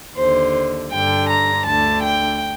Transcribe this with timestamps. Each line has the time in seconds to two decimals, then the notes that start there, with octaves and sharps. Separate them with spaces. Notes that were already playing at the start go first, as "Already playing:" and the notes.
0.16 D#2 D3 C5
0.91 G2 D3 G5
1.29 A#5
1.66 D2 D3 A5
2.03 G5